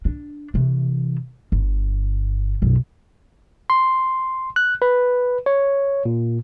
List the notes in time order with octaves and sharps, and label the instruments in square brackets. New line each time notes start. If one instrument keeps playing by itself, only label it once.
[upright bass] D4
C3 E3
G1
B1 F#2
[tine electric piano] C6
F#6
B4
C#5
A#2